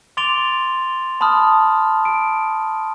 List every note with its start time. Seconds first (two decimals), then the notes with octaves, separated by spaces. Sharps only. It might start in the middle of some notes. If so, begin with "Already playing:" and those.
0.17 C6 D6 A6 D7 F7 G7
1.21 A5 B5 C6 D#6 F6
2.05 D7